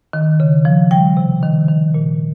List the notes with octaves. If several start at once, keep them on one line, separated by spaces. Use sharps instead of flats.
D#3
C#3
F3
G3 G5
C3
D#3
D#3
A#2